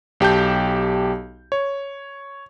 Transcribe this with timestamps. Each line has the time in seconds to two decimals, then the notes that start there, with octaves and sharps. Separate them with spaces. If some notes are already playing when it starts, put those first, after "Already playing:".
0.20 B1 G4 A5 G6
1.52 C#5